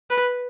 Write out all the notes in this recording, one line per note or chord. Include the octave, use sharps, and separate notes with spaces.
B4